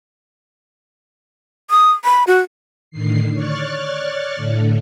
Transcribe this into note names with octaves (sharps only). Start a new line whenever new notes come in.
D#6
B5
F#4
A2 D3 D#3 C7
C#5 D5 C#6 F6 F#6 A6
A2 D3 A3